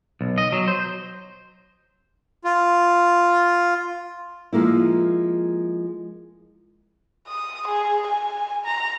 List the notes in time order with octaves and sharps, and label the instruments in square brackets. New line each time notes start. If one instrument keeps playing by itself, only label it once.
[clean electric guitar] B1
D#5
F#3
C5
[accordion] F4
[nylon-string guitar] F3 G#3 A#3 E4
[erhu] D#6
G#4
G#5
A#5